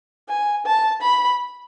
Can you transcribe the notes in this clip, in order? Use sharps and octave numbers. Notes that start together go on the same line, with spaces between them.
G#5
A5
B5